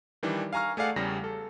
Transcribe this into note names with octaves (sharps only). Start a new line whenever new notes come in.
D#3 E3 G3 D4
F5 G#5 A#5 C#6 F6
A3 G#4 D5 F5 F#5
E2 C#3 G3 A#6
A4